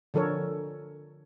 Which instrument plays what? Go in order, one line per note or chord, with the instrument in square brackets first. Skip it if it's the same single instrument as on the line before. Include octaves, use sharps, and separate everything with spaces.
[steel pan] D3 F3 A4 A#4 C#5